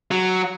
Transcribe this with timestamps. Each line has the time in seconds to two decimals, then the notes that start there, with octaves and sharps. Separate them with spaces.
0.11 F#3